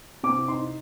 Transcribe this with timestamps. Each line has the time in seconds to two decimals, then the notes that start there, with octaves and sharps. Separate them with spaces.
0.23 C3 D6
0.48 D#4 C6